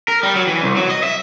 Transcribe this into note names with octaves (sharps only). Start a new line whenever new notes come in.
A#4
G3
F#3
E3
C2
F#3
D#5
E5